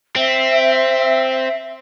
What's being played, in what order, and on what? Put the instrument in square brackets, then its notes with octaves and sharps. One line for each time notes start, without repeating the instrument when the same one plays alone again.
[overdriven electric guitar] C4 [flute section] E5